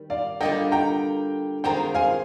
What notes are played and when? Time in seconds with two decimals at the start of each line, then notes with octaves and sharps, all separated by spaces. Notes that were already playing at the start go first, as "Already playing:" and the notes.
Already playing: D#3 G3
0.10 D5 F5
0.41 D3 G3 A#3 F4 D#5 G5
0.72 G5 A#5
1.64 D#3 G#3 C4 F4 G5 A#5
1.95 F5 G#5